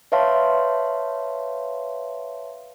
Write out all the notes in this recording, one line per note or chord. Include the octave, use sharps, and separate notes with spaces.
B4 C#5 E5 F5 A5 C6